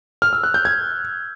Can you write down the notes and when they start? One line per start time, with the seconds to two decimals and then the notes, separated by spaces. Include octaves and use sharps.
0.22 F6
0.33 E6
0.44 F#6
0.54 G6
0.65 G#6